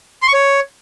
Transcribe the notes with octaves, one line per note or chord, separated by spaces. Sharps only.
C6
C#6
C#5